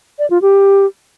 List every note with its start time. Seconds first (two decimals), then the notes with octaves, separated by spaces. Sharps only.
0.19 D5
0.30 F4
0.42 G4